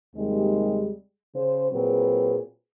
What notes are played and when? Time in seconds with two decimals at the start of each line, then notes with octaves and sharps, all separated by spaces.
0.15 D#2 C3 G3 G#3
1.35 C#3 C5
1.72 A#2 F#3 C4 G#4 B4